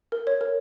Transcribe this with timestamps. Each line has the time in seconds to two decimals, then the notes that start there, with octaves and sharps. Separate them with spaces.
0.12 A#4
0.27 C#5
0.41 A#4